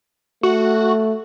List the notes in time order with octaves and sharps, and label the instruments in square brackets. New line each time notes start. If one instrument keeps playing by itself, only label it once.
[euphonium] A3 [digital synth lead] F#4